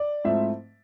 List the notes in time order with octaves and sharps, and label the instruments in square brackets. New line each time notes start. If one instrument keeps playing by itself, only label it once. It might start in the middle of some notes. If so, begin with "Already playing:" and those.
Already playing: [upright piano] D5
G#2 F3 A3 C4 E4 E5